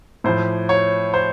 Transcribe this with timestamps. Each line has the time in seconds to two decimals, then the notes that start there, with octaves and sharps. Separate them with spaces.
0.24 A2 F3 C5
0.69 C#5
1.14 C5